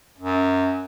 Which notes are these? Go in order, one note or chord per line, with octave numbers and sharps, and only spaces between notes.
F#2